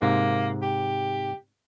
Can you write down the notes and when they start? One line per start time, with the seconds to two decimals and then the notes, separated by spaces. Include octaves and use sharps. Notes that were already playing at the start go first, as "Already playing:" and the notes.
0.02 G#2 C3 A#3
0.62 G4